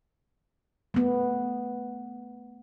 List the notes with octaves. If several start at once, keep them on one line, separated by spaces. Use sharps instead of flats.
A3 B3